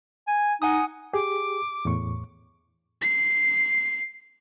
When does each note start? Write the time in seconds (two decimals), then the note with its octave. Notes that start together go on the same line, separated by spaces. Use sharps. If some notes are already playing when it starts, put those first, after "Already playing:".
0.27 G#5
0.62 D#4 F#5 G#5 D#6
1.13 G4 G#4 D6
1.85 E2 A2 C#6
3.02 C7